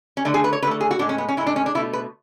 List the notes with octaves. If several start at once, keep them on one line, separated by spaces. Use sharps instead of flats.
C#4
D3 A3 D4
G#4
B4
C#5
D3 A3 A4 B4
G#4
F#4
A2 G#3 D4
C#4
B3
C#4
A2 G#3 E4
D4
C#4
D4
B2 A3 E4
B4